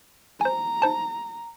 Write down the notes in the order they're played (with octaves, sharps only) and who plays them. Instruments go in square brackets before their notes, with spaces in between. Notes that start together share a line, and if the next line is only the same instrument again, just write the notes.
[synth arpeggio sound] C5 G#5 [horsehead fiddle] A#5
[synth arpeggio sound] D#4 C5 A5